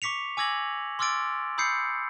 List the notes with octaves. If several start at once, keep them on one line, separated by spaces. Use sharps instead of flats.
C#6 D6 B6 C#7 F7
G#5 D6 E6 G#6 A#6 F#7
C6 D6 E6 F6 A6 D7
B5 D#6 E6 G6 C7 C#7